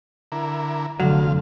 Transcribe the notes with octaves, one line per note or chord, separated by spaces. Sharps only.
D3 E4 A#4
F1 F2 D3 F#3 F5